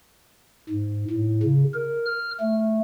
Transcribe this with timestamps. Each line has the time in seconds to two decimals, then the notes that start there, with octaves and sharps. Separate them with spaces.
0.70 G#2
1.11 A2
1.43 C#3
1.74 A#4
2.06 F6
2.40 A3